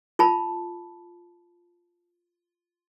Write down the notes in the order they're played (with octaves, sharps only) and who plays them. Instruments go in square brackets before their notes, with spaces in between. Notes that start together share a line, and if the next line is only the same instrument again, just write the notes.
[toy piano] F4 A5 B5